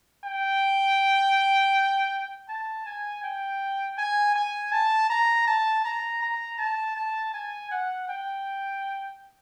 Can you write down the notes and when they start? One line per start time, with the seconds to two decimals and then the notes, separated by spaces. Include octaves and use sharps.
0.24 G5
2.49 A5
2.86 G#5
3.23 G5
3.98 G#5
4.36 G#5
4.72 A5
5.10 A#5
5.47 A5
5.85 A#5
6.22 A#5
6.59 A5
6.96 A5
7.34 G#5
7.71 F#5
8.08 G5